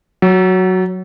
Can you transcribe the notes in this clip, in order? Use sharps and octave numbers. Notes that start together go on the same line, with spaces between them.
F#3